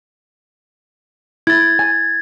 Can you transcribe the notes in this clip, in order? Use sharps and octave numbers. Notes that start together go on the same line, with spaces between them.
E4 G#6 A6
G#5